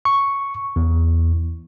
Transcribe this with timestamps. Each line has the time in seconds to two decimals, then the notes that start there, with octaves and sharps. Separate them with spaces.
0.05 C#6
0.76 E2